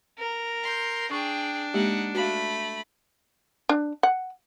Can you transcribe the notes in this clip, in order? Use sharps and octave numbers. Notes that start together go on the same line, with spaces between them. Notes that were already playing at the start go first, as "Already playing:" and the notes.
A#4
C6 G6
D4 G#4 G5 C#6
G#3 A#3 D#4 G4 F#5
A3 F#4 F5 B5
D4
F#5